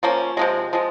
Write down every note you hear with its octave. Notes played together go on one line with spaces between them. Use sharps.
F3 A#3 C#4
C3 F3 G#3
F3 G#3